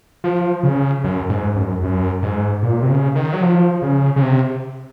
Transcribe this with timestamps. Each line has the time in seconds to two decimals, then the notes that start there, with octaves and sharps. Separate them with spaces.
0.24 F3
0.63 C#3
1.04 F#2
1.29 G#2
1.56 F#2
1.83 F#2
2.23 G#2
2.62 A#2
2.82 C3
2.90 C#3
3.15 D#3
3.33 F#3
3.42 F3
3.82 C#3
4.16 C#3
4.22 C3